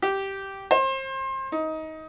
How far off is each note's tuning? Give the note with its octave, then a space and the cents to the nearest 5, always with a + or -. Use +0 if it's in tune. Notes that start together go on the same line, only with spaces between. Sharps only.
G4 -10
C5 +30
D#4 +20